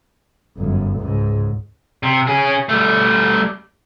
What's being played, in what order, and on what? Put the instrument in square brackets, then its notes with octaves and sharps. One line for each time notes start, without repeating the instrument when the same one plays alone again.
[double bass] G1 F#2
C#2 G#2
[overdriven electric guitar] C3
C#4 G#4
G3 A3